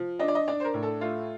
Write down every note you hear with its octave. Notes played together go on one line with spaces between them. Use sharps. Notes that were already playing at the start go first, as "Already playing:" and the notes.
Already playing: F3
D4 D#5
D5
D#5
D4 D5
C5
A#4
A2
A4
A3 F4